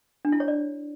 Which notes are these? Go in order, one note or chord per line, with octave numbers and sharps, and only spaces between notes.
D4
E4
C#5
D5